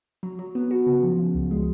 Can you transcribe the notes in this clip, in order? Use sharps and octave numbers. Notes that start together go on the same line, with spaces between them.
F#3
F#3
B3
F#4
C#3
F3
C#3
C#2
G#3